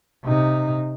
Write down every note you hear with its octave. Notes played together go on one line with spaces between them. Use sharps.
C3 D#4